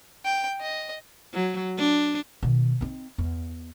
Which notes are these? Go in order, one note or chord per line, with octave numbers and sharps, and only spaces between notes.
G5
D#5
F#3
D4
B2 D#3
C4 D#4
E2